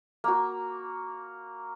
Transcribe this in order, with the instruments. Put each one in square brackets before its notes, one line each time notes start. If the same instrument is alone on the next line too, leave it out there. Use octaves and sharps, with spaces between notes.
[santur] A#3 F#4